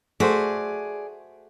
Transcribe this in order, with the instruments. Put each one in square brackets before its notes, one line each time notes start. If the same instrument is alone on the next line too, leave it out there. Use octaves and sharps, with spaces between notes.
[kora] A3 F#4 C5 [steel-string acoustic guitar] G#4 D5